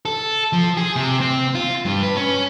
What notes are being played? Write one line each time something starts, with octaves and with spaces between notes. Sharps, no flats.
A4
F3
G#4
C3
C4
F4
G2
B4
C#4